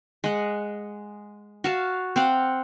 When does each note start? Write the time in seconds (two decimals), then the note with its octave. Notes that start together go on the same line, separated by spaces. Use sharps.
0.24 G#3 F#5
1.64 F#4 F5 A5
2.16 C4 F5 F#5